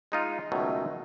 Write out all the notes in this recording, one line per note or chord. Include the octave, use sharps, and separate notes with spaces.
G#3 D#4 F4
C#2 B2 D#3 F#3 A3